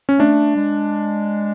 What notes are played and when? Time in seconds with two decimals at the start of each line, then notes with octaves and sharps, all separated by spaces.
0.09 C#4
0.19 A3 D4
0.56 G#3